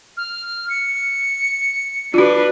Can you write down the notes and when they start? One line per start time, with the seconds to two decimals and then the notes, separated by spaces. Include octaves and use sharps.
0.17 F6
0.70 C#7
2.14 D4 F4 F#4 B4